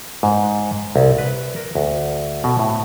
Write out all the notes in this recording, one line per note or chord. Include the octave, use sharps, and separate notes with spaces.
G#2
C2
B4
A#4
D2
B2
A2